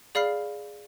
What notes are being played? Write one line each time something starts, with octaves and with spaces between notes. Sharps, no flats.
G#4 D5 F5 B5 F6 C7